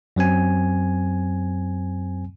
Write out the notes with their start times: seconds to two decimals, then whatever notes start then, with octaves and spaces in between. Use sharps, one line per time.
0.16 F#2 F#3 C4 G#5